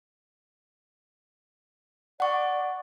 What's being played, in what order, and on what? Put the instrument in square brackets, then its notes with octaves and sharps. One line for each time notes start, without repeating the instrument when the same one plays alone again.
[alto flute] D5 [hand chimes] F#5 C#6